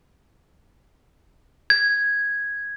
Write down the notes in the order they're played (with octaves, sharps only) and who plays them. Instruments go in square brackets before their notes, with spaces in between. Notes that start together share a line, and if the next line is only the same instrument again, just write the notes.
[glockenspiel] G#6